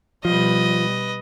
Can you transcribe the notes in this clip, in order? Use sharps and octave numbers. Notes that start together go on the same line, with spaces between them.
B2 F3 G3 B4 D#5